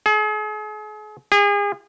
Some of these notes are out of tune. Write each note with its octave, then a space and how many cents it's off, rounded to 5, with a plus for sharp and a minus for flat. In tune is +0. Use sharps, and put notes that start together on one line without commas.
G#4 +40
G#4 -35